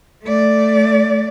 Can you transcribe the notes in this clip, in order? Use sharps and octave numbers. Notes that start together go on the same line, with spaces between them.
A3 D5